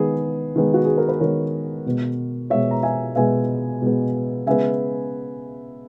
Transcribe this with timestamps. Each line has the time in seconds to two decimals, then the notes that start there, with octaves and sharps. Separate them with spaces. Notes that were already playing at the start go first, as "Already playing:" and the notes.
Already playing: D#3 G#3 B3 G#4 B4
0.56 D#3 G#3 B3
0.74 F#4
0.85 G#4
0.98 A#4
1.09 B4
1.20 D#3 G#3 B3 A#4 C#5
1.86 B2 G#3 B3
2.50 B2 G#3 B3 C#5 E5
2.71 A#5
2.83 E5 G#5
3.16 B2 G#3 B3 E5 G#5
3.82 B2 G#3 B3
4.46 C#3 G#3 B3 E5 G#5